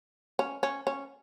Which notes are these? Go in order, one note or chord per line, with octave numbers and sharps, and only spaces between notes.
C#4
C#4
C#4